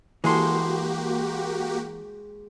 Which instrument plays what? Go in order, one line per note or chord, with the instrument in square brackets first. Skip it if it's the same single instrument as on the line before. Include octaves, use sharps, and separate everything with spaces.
[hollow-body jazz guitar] E3 A4 [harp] G#3 C6 [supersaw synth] A#3 F#4 G4